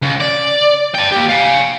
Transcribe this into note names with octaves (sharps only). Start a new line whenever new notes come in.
C#2
D5
G5 A5
A#3 G4
F5 G#5